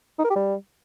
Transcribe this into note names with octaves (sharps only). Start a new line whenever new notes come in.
D#4
A#4
G4
G3